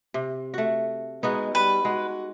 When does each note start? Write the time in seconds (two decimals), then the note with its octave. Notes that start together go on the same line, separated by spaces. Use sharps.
0.14 C3
0.54 A3 F#4
1.23 G#3 B3 D#4 F#4
1.55 G3 B4
1.85 G#3 F#4